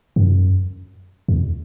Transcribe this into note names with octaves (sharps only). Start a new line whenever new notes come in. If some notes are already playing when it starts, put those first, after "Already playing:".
F#2
E2